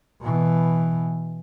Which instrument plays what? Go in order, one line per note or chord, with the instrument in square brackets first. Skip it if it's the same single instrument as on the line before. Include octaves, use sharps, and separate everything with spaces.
[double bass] B2 E3